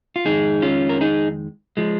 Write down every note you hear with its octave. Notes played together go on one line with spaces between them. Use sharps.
F4
F2 D#3 G#3 D#4 G#4
C#4 F4
A#4
D#4 G#4
F3 G#3